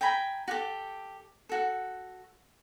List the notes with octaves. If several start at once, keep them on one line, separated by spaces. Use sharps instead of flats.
G5 G#5 A#5 B5
F#4 G4 A4
F#4 A4